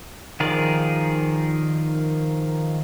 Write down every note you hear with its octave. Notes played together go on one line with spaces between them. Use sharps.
D#3 F3 G#4 A#4 D5